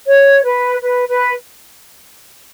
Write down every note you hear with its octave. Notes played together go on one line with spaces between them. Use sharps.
C#5
B4
B4
B4